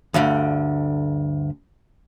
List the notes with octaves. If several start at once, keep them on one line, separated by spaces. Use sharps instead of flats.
D2 G2 D3